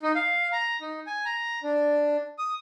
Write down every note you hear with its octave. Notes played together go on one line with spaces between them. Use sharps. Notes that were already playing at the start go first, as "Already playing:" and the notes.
D#4
F5
A#5
D#4
G#5
A#5
D4
D#6